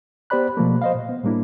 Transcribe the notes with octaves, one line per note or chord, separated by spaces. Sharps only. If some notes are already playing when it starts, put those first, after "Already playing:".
B3 G4 C5 D5 B5 F#6
B2 F3 A3 A#3
C5 D#5 F5
A#2
B3
A2 G3 A#3 D4 E4